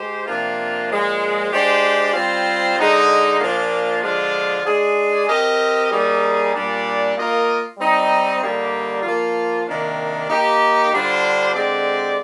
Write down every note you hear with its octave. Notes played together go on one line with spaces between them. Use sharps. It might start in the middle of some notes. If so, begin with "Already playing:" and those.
Already playing: G#3 G4 C5
C3 F3 A#3 D4 F4
A#2 F3 G#3
G#3 D4 G4 C5
G3 C4 F4 C5
D3 G#3 D#4
A#2 F3 A#3 D4 F4
D3 F3 G#3 D4 F4
G#3 D4 G#4
C4 G4 A#4 D#5
G3 A#3 D#4 G#4
A#2 G3 D4
A#3 F4 A#4 D#5
G3 C4 D#4
D3 G3 A#3 D#4 G4
F3 A#3 F4
C3 D#3 A#3 D4
A#3 D#4 G4
D3 G3 D4 F4 C5
D3 G#3 C4 G4 D5